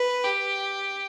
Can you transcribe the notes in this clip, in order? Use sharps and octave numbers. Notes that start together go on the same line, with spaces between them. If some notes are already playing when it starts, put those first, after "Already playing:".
Already playing: B4
G4